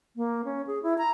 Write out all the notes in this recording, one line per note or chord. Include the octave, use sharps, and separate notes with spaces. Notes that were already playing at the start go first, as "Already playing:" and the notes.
A#3
C#4
G#4
E4
A#5